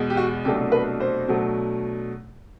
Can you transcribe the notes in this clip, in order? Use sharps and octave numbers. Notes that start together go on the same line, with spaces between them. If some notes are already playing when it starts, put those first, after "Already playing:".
Already playing: E2 B2 G#3
G4
F#4
C2 B2 F#3 A3 D4 G4
B4
C5
B2 F#3 A3 D4